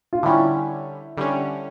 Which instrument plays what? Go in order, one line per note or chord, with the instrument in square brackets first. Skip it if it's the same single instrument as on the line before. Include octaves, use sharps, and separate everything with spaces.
[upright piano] F4
[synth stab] D3 G3 C#4 [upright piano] E4
[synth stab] D3 G3 C#4